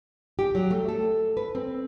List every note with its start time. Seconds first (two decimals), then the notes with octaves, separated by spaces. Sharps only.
0.39 G4
0.55 F#3
0.71 A3
0.89 A4
1.37 B4
1.55 C4